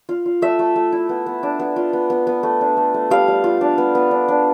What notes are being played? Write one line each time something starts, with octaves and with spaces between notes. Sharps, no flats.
F4
F4
A3 E5
A3
A3
E4
B3
B3
D4
B3
F4
B3
B3
B3
A3
D4
A3
A3
G3 F5
G3
F4
D4
B3
B3
D4
D4